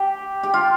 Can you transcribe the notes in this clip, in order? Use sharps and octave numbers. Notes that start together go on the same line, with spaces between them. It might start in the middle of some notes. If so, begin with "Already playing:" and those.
Already playing: G4
G4
F4